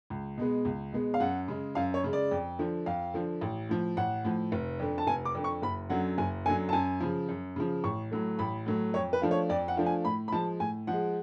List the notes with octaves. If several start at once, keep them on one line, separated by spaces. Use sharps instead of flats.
C#2
B2 G#3 B3
C#2
B2 G#3 B3
F5
F#2 F#5
C#3 G#3
F#2 F5
C#5
C#3 G#3
D5
F2
D3 F3
F2 F5
D3 F3
A1
A2 F3
A1 F#5
A2 F3
F1
F2 D3
A5
F1 G#5
D6
F2 D3
C#6
F#1 B5
F#2 D3 F#3 F#5
F#1 G#5
F#2 D3 F#3 G#5
A5
F#2 G#5
C#3 F3
F#2
C#3 F3
A1 C#6
A2 F#3 A3
A1 B5
A2 F#3 A3
F2 C#5
B4
F3 A3 D4 F4
C#5
F2 D5
F#5
F3 A3 D4 F4
G#5
A2 B5
B5
F3 G#3 A5
A2 G#5
F3 G#3 F#5